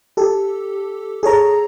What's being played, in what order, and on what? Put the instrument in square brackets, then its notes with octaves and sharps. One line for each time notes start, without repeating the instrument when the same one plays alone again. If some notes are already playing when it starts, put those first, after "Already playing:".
[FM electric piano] G4 A4
G#4 A4 C#5 A#5